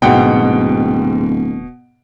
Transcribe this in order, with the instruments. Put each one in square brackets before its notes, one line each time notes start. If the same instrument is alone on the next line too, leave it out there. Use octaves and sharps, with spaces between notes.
[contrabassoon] D1 [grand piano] G#2 F#5 G5 [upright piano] B2